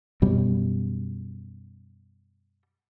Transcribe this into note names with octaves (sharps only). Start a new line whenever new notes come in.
F#2 B2 G3